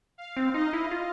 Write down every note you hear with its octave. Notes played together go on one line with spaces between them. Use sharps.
F5
C4
D#4 D#5
E4
F4